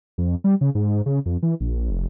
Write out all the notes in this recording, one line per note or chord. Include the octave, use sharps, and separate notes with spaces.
F2
G3
C#3
G#2
C#3
F2
E3
A#1
F1